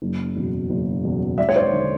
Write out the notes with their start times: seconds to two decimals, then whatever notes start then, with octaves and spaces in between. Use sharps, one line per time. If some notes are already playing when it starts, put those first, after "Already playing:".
0.02 F#1
0.36 E2 B2
0.70 F#1
1.05 E2 B2
1.38 G#1 D5 E5
1.49 C#5
1.56 C5 D5
1.73 D3